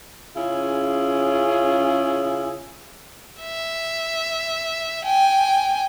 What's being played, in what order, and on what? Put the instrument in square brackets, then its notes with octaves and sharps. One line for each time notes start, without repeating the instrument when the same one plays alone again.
[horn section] C#3 C#4 E4 F4 G#4
[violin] E5
G5 G#5